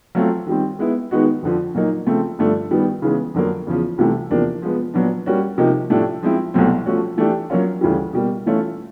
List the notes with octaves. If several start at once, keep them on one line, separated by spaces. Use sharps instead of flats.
F#3 A3 C4 F4
D#3 G3 C4
G#3 B3 E4
D#3 G#3 B3 D#4 F#4
F2 D3 F3
A#2 F#3 A#3 D#4
C#3 F3 A3 C4
G2 D3 F3 A3 D4
D#3 G3 B3
C#3 E3 G#3 B3
F2 D3 F#3 A#3
E2 C#3 F3
C2 C3 E3 A3
E2 C3 F3 A#3 D4
F3 G#3 B3
A#2 F#3 B3 D4
G3 A#3 C#4 F#4
C3 F3 A#3 D#4
A2 F3 A3 D4 G4
F3 G#3 C4 E4
C2 B2 F#3 A3 C4
F3 A3 C#4 F#4
E3 A3 D4 G4
F#3 A#3 C#4 F4
D2 C#3 E3 G3
B2 G3 A#3
E3 A3 C#4 F4